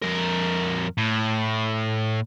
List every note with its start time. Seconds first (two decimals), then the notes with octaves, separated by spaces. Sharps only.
0.02 F2 A#4
0.98 A2